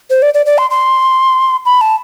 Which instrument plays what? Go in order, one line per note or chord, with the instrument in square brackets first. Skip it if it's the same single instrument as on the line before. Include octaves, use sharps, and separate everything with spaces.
[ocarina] C5
D5
D5
D5
C6
C6
B5
A5